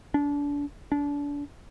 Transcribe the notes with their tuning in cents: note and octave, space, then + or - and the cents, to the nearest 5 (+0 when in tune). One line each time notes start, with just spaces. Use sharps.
D4 -30
D4 -30